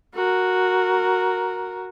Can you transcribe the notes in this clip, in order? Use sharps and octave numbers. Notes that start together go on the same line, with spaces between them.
F#4 A#4